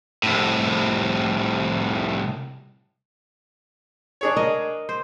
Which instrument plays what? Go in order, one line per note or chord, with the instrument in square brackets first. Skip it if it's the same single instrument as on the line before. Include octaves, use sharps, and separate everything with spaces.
[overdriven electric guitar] C2 A2
[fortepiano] D4 G#4 C#5
[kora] A#4 D#5
C5